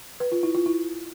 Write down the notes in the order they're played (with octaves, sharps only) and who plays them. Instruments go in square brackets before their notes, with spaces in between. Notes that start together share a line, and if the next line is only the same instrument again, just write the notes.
[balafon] B4
F4
E4
F4
E4